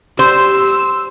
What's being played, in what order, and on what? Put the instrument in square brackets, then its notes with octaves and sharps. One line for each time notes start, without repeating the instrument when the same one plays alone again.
[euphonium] G4 [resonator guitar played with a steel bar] C5 [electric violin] E6